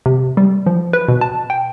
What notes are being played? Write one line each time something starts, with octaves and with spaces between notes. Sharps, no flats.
C3
G3
F3
B4
B2
A5
G5